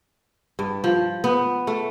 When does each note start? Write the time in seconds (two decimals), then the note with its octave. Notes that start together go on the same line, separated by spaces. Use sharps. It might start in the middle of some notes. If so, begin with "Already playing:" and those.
0.59 G2
0.84 F3
1.24 B3
1.67 A3